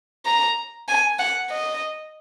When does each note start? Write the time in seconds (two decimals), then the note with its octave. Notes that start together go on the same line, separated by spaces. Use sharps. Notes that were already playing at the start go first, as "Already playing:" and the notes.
0.26 A#5
0.88 G#5
1.19 F#5
1.50 D#5